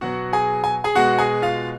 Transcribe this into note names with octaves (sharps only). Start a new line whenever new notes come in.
B2 F#3 F#4 F#5
G#4 G#5
G#5
G#4 G#5
B2 G#3 F#4 F#5
G#4 G#5
F4 F5